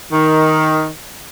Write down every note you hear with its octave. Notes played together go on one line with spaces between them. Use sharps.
D#3